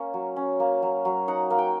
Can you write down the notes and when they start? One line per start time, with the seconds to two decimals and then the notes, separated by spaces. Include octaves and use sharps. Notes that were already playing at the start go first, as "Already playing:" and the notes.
Already playing: A#3 C#4
0.14 F#3
0.36 C#4
0.60 A#3
0.82 F#3
1.05 F#3
1.28 D#4 F#5
1.50 A#3
1.58 G5